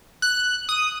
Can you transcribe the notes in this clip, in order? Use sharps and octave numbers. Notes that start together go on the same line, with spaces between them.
F#6
D#6